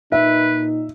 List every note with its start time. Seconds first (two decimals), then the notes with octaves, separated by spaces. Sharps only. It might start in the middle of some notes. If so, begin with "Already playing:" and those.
0.12 A#2 D#4 B4 E5